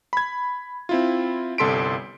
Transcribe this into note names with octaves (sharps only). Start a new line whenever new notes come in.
B5 G#6
C4 E4 F4
G1 C2 A4 C6 B6 D7